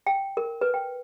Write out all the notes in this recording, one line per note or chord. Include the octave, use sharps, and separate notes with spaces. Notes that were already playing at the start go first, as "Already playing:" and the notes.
G5
A#4
B4
G5